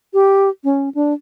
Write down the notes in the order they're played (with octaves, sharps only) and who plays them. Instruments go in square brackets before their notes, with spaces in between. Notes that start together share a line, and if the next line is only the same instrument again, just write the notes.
[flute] G4
C#4
D4